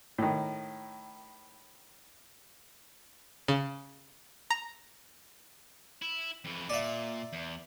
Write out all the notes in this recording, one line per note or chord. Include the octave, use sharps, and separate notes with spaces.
A2 D#3
C#3
A#5
E4
F2 E3
A#2 D5 E5
E2